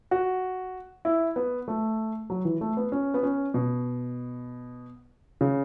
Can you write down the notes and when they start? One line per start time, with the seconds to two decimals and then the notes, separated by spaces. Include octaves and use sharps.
0.11 F#4
1.05 E4
1.36 B3
1.68 A3
2.30 F#3
2.45 E3
2.61 A3
2.77 B3
2.92 C#4
3.14 B3
3.23 C#4
3.54 B2
5.41 C#3